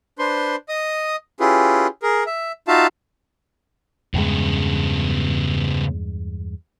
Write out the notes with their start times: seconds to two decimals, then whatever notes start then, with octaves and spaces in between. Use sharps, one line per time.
0.19 D4 B4 C5 C6
0.69 D#5 D#6
1.40 C#4 E4 F4 G4 G#4 B4
2.03 G#4 A#4
2.27 E5
2.68 D#4 F4 F#4 E5 F5 A5
4.14 E2 G2 C#3 G#3 B3